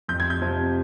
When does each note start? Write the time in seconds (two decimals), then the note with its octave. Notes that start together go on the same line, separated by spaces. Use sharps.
0.08 F2 G6
0.20 G#6
0.30 G6
0.42 C3 F3